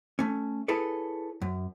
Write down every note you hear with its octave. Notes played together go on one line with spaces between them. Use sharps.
A3 C#4
E4 G#4 A4 B4 C#5
F#2